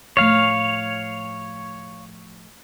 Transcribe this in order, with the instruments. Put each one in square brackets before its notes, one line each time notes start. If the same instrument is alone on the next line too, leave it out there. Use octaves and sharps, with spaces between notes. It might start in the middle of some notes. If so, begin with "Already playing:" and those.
[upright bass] A2 F3 [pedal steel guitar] C#5 F5